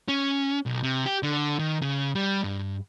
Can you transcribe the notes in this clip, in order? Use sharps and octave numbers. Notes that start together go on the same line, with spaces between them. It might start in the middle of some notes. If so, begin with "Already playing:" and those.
C#4
B1
C3
G4
D3
D#3
C#3
G3
G2